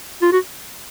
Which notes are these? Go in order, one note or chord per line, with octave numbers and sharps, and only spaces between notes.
F4
F#4